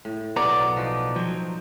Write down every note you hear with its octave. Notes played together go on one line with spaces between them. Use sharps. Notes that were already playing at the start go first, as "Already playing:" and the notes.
A2
B1 B3 D5 A#5
F#3
F3 D#4 F#4
F3 F#3 G5